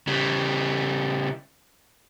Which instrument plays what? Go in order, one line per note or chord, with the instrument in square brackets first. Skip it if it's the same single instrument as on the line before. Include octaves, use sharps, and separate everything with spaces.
[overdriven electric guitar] C#3 G3